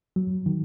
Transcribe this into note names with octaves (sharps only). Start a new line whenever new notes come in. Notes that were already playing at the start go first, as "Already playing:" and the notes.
F#3
D#3